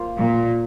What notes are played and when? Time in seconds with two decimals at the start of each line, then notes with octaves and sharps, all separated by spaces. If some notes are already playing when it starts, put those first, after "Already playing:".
Already playing: A#3 F4 A#4 C5
0.18 A#2